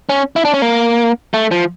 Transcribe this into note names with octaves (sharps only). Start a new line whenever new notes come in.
C#4
E4
D4
C#4
A#3
A3
F3